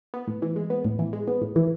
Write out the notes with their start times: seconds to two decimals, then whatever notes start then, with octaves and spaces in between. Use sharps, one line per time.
0.14 B3
0.27 A2
0.42 E3
0.56 G#3
0.70 B3
0.85 A2
0.99 E3
1.13 G#3
1.28 B3
1.41 A2
1.56 E3